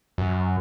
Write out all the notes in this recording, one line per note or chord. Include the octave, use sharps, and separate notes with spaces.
F#2